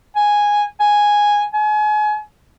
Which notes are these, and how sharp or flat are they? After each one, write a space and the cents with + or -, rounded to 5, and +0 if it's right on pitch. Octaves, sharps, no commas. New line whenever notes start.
G#5 -5
G#5 -5
G#5 +35